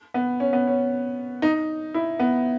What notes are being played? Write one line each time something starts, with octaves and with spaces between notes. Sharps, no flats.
B3
C#4
B3
C#4
D#4
E4
B3